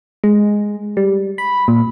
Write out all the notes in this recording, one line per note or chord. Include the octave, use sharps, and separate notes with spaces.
G#3
G3
B5
A#2